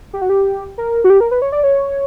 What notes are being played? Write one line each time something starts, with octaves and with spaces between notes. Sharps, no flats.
G4
F#4
G4
A#4
F#4
G4
A#4
B4
C#5
D5
C#5